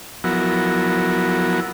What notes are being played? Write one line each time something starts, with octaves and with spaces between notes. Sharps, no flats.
F3 F#3 B3 E4 F#4 A#4